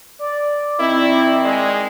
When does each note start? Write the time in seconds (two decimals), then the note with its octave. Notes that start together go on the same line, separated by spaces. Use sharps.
0.19 D5
0.80 D#3 C4 E4
1.45 G#3